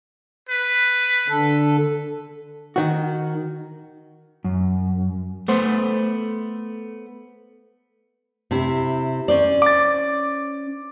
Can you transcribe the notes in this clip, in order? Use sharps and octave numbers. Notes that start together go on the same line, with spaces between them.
B4
D3 A4
D#3 F#4
F#2
A3 B3 C5
C3 E4
C#4 C5 D5
D6 A6